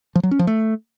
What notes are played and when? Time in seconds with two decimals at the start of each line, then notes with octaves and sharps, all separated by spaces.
0.15 F3
0.23 F#3
0.31 C#4
0.39 F3
0.47 A3